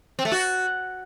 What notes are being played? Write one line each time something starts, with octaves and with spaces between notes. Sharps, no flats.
C4
A3
F#4